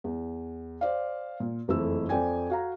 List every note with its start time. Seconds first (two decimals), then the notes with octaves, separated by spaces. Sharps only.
0.04 E2
0.81 C5 D5 F5
1.40 A#2
1.68 F#1 F2 E3 A3 E4 E6
2.09 F2 D5 G5 G#5 G#6
2.50 F#4 F5 A#5